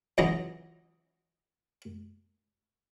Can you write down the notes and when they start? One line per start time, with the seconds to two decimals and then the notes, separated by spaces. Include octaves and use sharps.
0.18 C#2 E3 F#3 E4 D#5 A#5